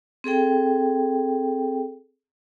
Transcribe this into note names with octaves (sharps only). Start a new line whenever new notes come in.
C4 G#4 A4 G5